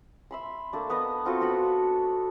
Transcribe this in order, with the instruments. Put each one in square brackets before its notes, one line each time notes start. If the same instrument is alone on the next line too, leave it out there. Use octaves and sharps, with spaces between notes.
[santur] E5 B5 C6
A3 A#3 D4
B3 B4 D#5
C4 F4 F#4 A4
B3 D4 F#4 B5